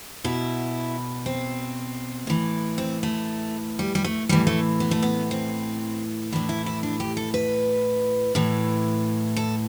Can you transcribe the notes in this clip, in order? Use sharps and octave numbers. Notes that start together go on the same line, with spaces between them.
B2 E4
C4
A2 E3
C4
A3
G3
G3
A3
A2 E3 G3
A3
B3
A3
B3
C4
A2 E3 D4
E4
E4
D4
G4
A4
B4
A2 E3
A4